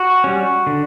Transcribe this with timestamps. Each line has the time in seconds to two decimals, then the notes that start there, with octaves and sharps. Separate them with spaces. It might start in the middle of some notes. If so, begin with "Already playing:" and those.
Already playing: F#4
0.24 G3 C#4
0.67 D3